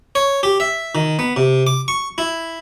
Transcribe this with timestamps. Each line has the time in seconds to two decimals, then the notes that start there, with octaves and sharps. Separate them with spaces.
0.15 C#5
0.43 G4
0.60 E5
0.95 D#3
1.19 B3
1.36 C3
1.67 D6
1.88 C#6
2.18 E4